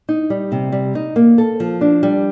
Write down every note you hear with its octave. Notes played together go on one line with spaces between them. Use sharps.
D#4
G3
C3
G3
D#4
A#3
A4
F3
D4
G3